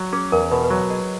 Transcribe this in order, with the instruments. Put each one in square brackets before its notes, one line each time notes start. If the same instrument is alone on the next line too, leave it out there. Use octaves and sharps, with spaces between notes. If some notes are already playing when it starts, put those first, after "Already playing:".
Already playing: [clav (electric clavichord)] F#3
[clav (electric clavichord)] C#4 [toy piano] G#4
[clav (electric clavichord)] E2 [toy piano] A#4
[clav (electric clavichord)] B2 [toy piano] B4
[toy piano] B4
[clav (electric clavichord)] F#3 [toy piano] C#5
[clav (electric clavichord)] G#4 [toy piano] D#5